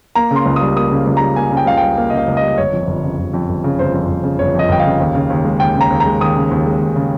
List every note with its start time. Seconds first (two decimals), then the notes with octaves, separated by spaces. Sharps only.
0.15 A#3 A#5
0.31 C#3
0.36 C6
0.46 C#2
0.56 G3 D#6
0.77 A#3 D#6
0.91 C#3
1.07 C#2
1.17 G3 A#5
1.36 A#3 G#5
1.51 C#3
1.57 G5
1.66 C#2 F5
1.77 G3 G5
1.98 A#3
2.10 C#3 D#5
2.18 F5
2.28 C#2
2.37 D#5
2.42 G3
2.58 G1 C#5
2.73 F2
2.87 G1
3.03 C#3
3.19 G1
3.34 F2
3.49 G1
3.64 C#3
3.78 G1 C5
3.94 F2
4.08 G1
4.23 C#3
4.39 G1 C#5
4.55 F2 D#5
4.69 G1 G5
4.80 F5
4.85 C#3
5.00 D#2
5.15 C#3
5.30 D#2
5.45 G#3
5.60 D#2 G5
5.75 C#3
5.81 A#5
5.90 D#2
6.00 A#5
6.06 G#3
6.21 D#2 D#6
6.37 C#3
6.51 D#2
6.66 G#3
6.82 D#2
6.96 C#3